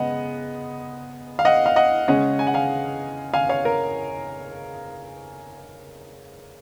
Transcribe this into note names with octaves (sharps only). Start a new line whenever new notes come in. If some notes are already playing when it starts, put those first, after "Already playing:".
Already playing: C#3 G#3 B3 D#5 F#5
F5
D#5 F#5
F5
D#5 F#5
C#3 G#3 C#4 D#5 F#5
G#5
F#5
F5 G#5
F5 G#5
C#5 F5
A#4